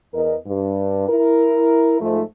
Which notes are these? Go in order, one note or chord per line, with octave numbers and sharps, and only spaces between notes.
E2 A#4 D#5
G2
E4 A#4
G#2 F3 A3